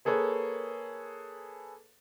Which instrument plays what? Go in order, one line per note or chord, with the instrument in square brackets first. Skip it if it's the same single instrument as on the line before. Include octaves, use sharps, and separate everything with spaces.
[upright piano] A#3 G#4 A4 B4 C#5